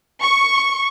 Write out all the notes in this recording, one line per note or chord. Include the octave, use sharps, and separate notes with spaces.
C#6